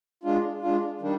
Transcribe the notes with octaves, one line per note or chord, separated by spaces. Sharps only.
G#3 D4 F4
G#3 D4 F4
D#3 G3 D4